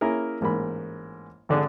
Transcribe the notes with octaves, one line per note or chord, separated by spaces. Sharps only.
A#3 C#4 E4 G#4 A#4
A1 G#2 A#3 B5
G#1 D3 D4 G#4